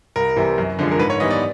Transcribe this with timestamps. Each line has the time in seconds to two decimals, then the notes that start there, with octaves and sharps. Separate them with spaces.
0.16 C2 A#4
0.36 C3 E3 G3
0.58 F#2
0.79 D3 F3 G#3
0.91 A#4
0.99 G#2 B4
1.10 C#5
1.20 E3 G3 B3 D#4 D#5
1.31 D5